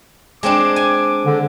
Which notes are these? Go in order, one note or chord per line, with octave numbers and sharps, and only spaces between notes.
G#3 C4 D4 D6
G#5
D3